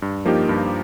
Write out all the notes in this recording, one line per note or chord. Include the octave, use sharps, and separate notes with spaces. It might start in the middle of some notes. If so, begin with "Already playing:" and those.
G2
F3 A#3 D#4 G4
G2